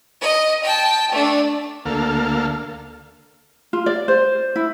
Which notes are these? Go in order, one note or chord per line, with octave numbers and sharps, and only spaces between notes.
D#5
G5 A5
A3 D4
D2 A#3 A4 F5
F4
D5
C5
E4